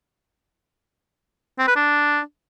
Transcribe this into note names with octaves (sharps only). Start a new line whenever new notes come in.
C4
B4
D4